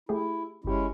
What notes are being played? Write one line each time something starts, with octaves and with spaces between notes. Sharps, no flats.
A3 E4 G4 G#4
G1 G#3 C#4 E4 G4